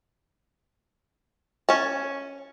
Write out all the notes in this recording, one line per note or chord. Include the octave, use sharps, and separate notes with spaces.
C#4 A5